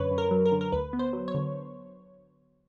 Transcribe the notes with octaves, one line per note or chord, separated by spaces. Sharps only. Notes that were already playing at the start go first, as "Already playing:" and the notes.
Already playing: F#2 D3 B4 C#5
F#2
A#4
F#3
A#4
D3
A#4
D2 B4
B3
C5
F#3
C#5
D3